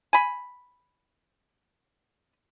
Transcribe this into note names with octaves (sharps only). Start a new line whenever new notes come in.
G#5 B5